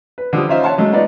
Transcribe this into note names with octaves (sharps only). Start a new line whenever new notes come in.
B4
D3 F3 G3 D#6
C#4 D#4 F4 C5 E5 F5
C#5 F#5 A5 C6
F#3 G#3 A3
B3 D#4 F4 D5